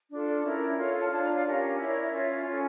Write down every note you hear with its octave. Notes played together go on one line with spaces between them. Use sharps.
D4 F4 A4
C#4 E4 A#4
F4 A4 C#5
F5
A5
D4 F4 C#5 A5
A#5
F5
C#4 G4 A#4 C#5
E4 A#4 C#5 E5
D5
E5
C#4 F4 C#5
C#4 F4 A4